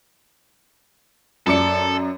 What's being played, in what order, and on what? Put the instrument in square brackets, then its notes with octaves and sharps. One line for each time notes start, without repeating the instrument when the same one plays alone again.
[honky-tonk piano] F#2 D5 C#7 [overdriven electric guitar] A4